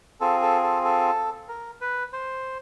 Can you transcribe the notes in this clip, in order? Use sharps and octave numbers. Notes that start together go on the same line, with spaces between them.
C4 F4 G#4 A4
A4
A4
A4
A#4
B4
C5